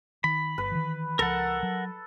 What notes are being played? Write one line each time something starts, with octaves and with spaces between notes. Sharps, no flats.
D#3 B5
G1 B4
D#3 E3
C#2 F3 A4 A#4 F#5
F#3